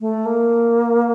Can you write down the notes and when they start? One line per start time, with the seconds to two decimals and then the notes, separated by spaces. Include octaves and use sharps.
0.01 A3
0.26 A#3